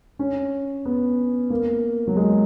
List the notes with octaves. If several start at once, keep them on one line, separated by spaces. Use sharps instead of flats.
C#4
B3
A#3
F#3
G#3